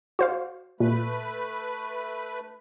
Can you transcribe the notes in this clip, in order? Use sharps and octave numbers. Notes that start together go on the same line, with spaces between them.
F#4 C5 F5
A#2 A3 B4